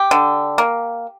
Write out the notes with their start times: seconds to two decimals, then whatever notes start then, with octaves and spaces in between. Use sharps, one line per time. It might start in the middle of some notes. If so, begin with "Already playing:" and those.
Already playing: G4
0.11 D3
0.58 A#3